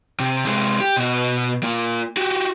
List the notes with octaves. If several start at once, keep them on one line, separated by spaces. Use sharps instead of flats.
C3
C3 G#3
G4
B2 F#4
A#3 F4
F#4 G4